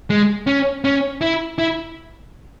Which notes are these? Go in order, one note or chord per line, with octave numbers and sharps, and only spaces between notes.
G#3
C#4
C#4
E4
E4